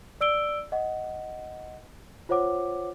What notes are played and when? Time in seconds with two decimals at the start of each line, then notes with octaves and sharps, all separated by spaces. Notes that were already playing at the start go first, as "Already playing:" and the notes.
0.21 D5 E6 D7 G7
0.72 D#5 F#5
2.29 F4 C5 C#5 F#5 D6